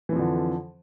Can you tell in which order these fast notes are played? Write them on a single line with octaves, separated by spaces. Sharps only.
E3 F2 F3 D3